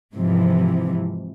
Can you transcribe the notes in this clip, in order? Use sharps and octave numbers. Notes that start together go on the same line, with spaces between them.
G#2 C3 E3 F3